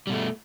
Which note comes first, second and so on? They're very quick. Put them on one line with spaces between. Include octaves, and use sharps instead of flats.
G3 B2 A3